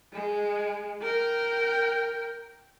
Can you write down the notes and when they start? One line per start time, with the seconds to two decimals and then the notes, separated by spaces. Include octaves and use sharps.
0.13 G#3
1.02 A#4 G5